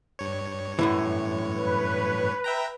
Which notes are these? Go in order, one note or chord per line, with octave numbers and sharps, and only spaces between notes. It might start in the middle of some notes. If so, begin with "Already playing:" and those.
G2 C#5
F#2 A2 E3
B4
E5 G5 A#5